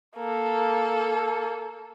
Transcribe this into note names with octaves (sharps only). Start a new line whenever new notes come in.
A#3 A4